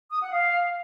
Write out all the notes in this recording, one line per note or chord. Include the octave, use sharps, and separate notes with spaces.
D#6
F#5
F5